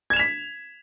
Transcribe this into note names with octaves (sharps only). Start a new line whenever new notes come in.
G#6 B6 E7 F7